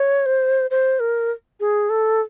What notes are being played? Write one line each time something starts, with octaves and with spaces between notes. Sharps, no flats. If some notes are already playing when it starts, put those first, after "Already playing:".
Already playing: C#5
C5
C5
A#4
G#4
A4